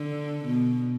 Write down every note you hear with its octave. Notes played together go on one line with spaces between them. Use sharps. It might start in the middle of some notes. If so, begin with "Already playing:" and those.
Already playing: D3
B2